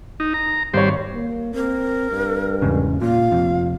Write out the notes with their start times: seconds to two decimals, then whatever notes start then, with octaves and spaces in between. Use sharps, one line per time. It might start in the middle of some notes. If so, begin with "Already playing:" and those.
0.20 D#4
0.34 A#5
0.74 G#1 G3 C5 C#5
1.15 A#3
1.55 C4 A#4
2.11 G2
2.62 E2 G#2 C#3
3.02 A#2 F4 F5
3.32 F2 C3